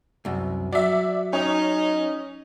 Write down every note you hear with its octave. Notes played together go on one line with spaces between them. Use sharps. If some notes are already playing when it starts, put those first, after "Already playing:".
C2 F#2
F#3 D5 E5
C#4 D#4